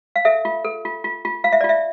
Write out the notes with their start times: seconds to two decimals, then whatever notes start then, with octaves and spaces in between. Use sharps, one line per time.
0.16 F5
0.25 A4 E5
0.45 F4
0.64 A4
0.85 F4
1.04 F4
1.25 F4
1.44 F4 F5
1.53 E5
1.61 D5
1.64 F4
1.69 E5